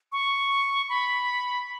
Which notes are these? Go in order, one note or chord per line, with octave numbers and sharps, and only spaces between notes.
C#6
B5